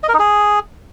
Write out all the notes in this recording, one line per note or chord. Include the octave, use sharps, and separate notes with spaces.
D#5
A#4
D#4
G#4